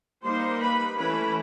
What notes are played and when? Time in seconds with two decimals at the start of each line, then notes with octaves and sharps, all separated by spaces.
0.25 G3 A#3 D#4 C5 C6
0.61 B4 B5
0.98 E3 A3 C#4 E4 B4 B5